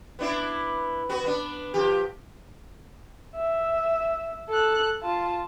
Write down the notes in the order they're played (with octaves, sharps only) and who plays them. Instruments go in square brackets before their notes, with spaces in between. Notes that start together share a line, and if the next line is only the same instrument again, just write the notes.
[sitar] B3 D4 E4
B3 F#4
B3 D4
F3 G4
[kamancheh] E5
A4 F#6
F4 A5